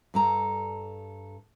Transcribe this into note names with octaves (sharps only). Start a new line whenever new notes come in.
G2 A4 A#5